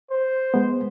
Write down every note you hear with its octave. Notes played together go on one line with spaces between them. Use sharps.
C5
G#3 B3